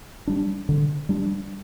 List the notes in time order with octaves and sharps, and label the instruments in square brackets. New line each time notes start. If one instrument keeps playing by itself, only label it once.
[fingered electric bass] G3 D4
D3
G3 D4